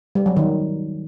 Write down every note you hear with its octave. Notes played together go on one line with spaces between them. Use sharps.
G3
F#3
D#3